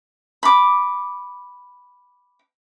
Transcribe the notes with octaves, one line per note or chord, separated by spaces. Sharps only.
B5 D6